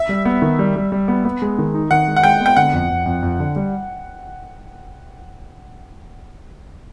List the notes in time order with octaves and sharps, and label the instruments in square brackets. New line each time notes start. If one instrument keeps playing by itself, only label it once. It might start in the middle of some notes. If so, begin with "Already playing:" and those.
Already playing: [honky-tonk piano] E5
[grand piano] G3
B3
D#3
G3
G3
G3
B3
B3
G#3
D#3
D#4
[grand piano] D#3 [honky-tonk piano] F#5
[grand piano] G#3
[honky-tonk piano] F#5
[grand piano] G#3 [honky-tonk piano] G5
[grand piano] B3
[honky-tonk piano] G5
[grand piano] D3 [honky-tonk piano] F#5
[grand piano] F2
F2
F2
F2
D3
G3